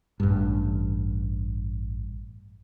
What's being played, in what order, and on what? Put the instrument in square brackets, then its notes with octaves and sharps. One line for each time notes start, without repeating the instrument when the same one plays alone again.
[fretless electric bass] A1 G2